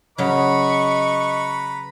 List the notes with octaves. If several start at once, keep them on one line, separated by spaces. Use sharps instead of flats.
C#3 F#3 B4 D#5 A#5 B5 C#6